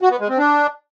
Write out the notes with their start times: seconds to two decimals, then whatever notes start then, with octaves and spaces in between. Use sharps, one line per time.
0.01 F#4
0.11 B3
0.20 G#3
0.29 C4
0.38 D4